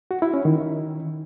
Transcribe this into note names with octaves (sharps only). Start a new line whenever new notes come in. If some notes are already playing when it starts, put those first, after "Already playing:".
F#4
E4
C#4
D#3